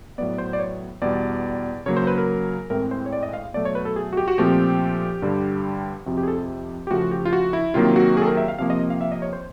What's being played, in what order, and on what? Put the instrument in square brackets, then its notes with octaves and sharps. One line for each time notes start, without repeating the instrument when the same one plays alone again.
[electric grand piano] A2 F#3 B3 D5
C5
D5
C#5
E2 B2 G3 D5
C#3 F#3 A#3 C#5
C5
B4
A#4
A2 E3 G#3 C4 A#4
C5
C#5
D5
D#5
F5
B2 F#3 A3 D5
C#5
B4
A4
G#4
F#4
G4
F#4
A#2 F3 A3 C4 G4
G2 D3 G3
F2 C3 F3 F#4
G4
G#4
A4
G4
G4
C#3 F3 A3 F#4
G4
F4
F#4
E4
C3 D#3 F#3 A#3 F4
F#4
G#4 A4
A#4
E5
F5
C3 F3 A#3 F5
D#5
F5
E5
D#5
C#5
C5